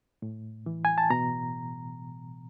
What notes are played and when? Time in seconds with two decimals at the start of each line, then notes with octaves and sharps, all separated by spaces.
0.22 A2
0.66 E3
0.85 G#5
0.98 A5
1.10 B2 A#5